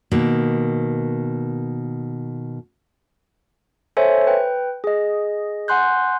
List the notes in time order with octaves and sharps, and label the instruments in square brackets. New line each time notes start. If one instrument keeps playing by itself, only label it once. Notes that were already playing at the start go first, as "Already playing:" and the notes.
[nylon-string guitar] B2 D#3 A#3
[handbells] A4 C5 C#5 E5 G#5
B4 G5
G#4 D#5
F#5 G#5 C6 F#6 G6